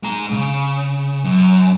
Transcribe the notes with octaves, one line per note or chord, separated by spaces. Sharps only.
G#3 A#5
C#3
F#2